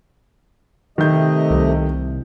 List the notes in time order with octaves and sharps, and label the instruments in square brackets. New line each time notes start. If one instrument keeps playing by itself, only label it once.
[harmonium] C3 A3 D#5 [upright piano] D#3 G6
[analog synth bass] C2